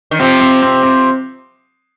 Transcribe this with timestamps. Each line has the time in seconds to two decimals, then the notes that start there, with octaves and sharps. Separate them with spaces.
0.11 D#3
0.19 C3 F3 C4
0.41 C4
0.62 C4
0.83 C4